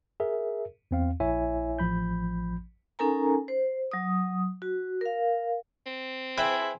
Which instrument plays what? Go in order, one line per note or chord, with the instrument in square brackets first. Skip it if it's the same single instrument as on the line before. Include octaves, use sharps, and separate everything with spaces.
[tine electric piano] G#4 A#4 E5
E2 C4 F5
A#1 E4 C#5 E5 G#5
A1 F3 B5 G6
[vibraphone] C#4 D#4 A4 A#4 G#5 A#5
C5
F#3 D#6
F#4
A#4 F5
[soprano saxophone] C4
[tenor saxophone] E4 [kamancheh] G#4 C5 [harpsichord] B4 E5 G5